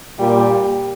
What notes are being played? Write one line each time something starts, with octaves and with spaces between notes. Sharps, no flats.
A#2 G3